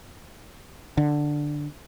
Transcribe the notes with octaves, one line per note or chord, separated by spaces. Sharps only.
D3